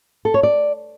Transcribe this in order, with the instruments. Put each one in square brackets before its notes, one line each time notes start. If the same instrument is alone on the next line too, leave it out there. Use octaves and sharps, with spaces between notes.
[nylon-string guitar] A4
C#5
D5